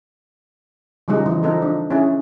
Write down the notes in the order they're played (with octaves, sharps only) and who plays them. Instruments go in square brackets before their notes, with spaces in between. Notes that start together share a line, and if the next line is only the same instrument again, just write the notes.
[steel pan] C#3 F3 G3 G#3 D#4
E3
F3 C4 D#4 A4
D4
C#4 E4 G#4